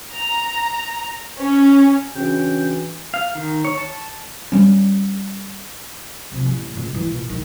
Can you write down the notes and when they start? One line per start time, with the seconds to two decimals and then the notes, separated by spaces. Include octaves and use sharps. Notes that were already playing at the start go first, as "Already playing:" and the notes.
0.12 A#5
1.37 C#4
2.15 C#3 E3 D4 F#4 G5
3.14 F5
3.35 D#3
3.65 C#5
3.78 A5
4.52 G3 C#4
6.32 C3 F3
6.46 A1
6.74 A#2 C#3
6.90 G2 E3
7.12 A#2
7.29 D#3 G#3